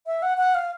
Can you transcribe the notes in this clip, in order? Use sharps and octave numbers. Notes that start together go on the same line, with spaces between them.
E5
F#5
F#5
F5